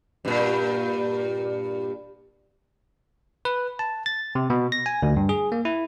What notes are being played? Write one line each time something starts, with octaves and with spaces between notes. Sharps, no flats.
G2 A#2
B4
A5
A6
C3
B2
A#6
G#5
D2
G2
G#4
A#3
E4